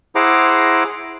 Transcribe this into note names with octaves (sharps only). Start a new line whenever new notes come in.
E4 G#4 C5 F#5 A#5 D6